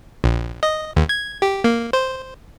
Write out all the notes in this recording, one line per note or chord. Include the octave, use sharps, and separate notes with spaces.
A#1
D#5
D#2
G#6
G4
A#3
C5